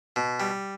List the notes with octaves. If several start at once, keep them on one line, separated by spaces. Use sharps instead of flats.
B2
G3